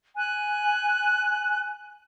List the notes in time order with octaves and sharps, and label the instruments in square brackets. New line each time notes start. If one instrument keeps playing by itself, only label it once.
[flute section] G#5 F#6